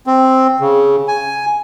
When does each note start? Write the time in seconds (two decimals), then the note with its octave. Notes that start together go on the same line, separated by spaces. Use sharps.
0.07 C4
0.60 C#3
1.08 G#5